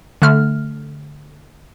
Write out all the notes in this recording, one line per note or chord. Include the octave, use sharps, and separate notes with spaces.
D3 A3 F6